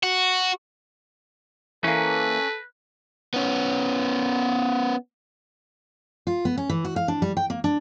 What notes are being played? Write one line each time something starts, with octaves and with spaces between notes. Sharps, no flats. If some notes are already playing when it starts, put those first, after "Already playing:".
F#4
E3 A#3 C#4 A4 B4
B3 C#4
F4
B3
C#4
E3
F#4
F5
D4
G3
G5
A#3
D4